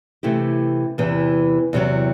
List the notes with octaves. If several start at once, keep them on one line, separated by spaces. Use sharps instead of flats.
C3 E3 A3 E4 G4
E2 C3 E3
E2 C3 F#3